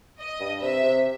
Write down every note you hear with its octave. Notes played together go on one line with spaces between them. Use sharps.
D#5
G2
C3 E5
C3